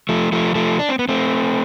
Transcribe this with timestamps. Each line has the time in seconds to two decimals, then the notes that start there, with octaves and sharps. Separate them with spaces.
0.09 F3 A3
0.32 F3 A3
0.55 F3 A3
0.79 D4
0.89 C4
0.99 B3
1.09 A3 C4